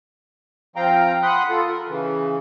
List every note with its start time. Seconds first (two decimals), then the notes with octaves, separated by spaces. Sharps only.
0.76 F3 C4 F5 G5 A#5
1.23 F#5 B5 C6 D#6 F#6
1.49 F4 A4
1.66 A#4
1.88 C#3 E3